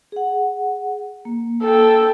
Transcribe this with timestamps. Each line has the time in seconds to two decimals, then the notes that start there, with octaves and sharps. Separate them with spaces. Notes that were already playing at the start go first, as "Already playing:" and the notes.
0.12 G#4 F#5
1.25 A#3
1.63 A4 G5